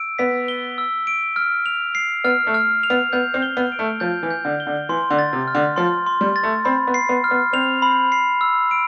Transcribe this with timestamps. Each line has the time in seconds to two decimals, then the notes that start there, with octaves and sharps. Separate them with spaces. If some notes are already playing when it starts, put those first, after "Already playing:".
Already playing: E6 D7
0.18 B3 B6
0.48 G7
0.78 E6
1.07 D7
1.36 F6
1.66 F7
1.95 C7
2.24 B3 F6
2.47 A3
2.54 F6
2.83 F7
2.90 B3
3.12 B3 G6
3.34 C4
3.42 G7
3.57 B3
3.72 D7
3.79 A3
4.00 F3 G6
4.23 E3
4.31 G6
4.45 D3
4.60 G7
4.67 D3
4.89 E3 C6
5.10 D3
5.19 A6
5.33 C3
5.48 F6
5.55 D3
5.76 F3 C6
6.06 C6
6.21 G3
6.36 A6
6.43 A3
6.65 C4 B5
6.87 B3
6.94 C7
7.09 B3
7.24 F6
7.31 B3
7.53 C4 F7
7.82 B5
8.12 C7
8.41 E6
8.71 D7